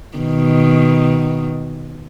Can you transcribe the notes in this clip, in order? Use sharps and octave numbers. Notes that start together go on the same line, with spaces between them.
B2 D#3